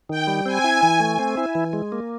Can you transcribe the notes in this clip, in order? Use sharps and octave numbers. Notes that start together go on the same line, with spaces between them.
D#3 G5
G3
C4 G#5
E4
E3
A3
C4
E4
E3
G#3
A#3